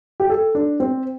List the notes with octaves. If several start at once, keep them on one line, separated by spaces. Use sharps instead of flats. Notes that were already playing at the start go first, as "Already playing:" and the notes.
G4
A4
D4
C4